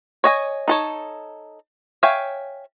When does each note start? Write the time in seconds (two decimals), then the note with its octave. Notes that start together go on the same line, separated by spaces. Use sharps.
0.24 C#5 D#5 G#5
0.68 D#4 A4 C#5
2.03 C#5 E5 F5 G5 G#5